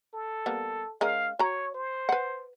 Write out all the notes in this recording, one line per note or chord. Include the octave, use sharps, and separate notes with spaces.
A4
G3 A#3 B3
G#3 C#4 A#4 F5
F#4 C#5 A#5
C5
B4 F#5